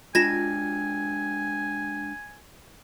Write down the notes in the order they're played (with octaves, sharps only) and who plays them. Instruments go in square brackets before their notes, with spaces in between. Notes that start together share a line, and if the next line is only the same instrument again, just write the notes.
[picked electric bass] G#3 D4 [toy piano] F4 [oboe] G#5 [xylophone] G#6 A#6 E7